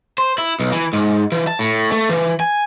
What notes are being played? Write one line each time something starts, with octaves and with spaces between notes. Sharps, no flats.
C5
E4
B1
E3
G#2
E3
A5
A2
A3
E3
G#5